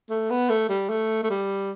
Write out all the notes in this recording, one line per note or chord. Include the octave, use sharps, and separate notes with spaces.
A3
B3
A3
G3
A3
A3
G3